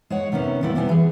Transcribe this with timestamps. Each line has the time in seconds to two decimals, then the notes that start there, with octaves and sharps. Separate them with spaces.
0.10 G#3 C#5 F#5
0.32 C3 D#3 B3 C#4
0.63 A#2 G3 B3 E4 D5
0.75 C3 G3 B3 E4 G#5
0.89 E3 G#4